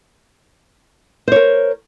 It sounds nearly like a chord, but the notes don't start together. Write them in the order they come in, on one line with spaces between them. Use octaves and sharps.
C5 C#5 A#4